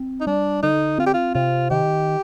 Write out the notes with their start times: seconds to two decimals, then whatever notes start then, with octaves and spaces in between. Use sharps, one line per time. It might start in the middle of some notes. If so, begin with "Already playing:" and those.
Already playing: C4
0.21 D#4
0.27 G3 D4
0.63 D3 D#4
0.98 C4 F4
1.06 G4
1.14 F4
1.35 C3 F4
1.70 D#3 G4